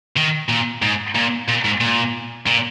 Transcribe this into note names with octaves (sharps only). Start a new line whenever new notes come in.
D#3
A#2
G#2
A#2
A#2
G#2
A#2
A#2